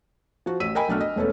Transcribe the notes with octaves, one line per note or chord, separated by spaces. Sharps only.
F3 F#4
A1 E6 B6 D#7
A#4 D#5 G5 G#5 B5
B1 A3 D4 F#4 F6
D#5
E1 A3 B3 C#4 A4